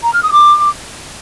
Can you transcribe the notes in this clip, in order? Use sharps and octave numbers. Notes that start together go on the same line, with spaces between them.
A#5
F6
D#6
D6